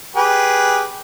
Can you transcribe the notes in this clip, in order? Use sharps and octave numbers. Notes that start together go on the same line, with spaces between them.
G4 G#4 B4